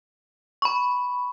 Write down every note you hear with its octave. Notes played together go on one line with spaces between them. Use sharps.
B5 C#6